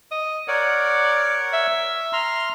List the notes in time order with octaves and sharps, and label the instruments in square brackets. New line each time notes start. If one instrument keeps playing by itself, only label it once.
[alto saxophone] D#5
[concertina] A#4 C#5 F#5 [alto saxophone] D5
[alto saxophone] E5
[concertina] A#5 C6 F6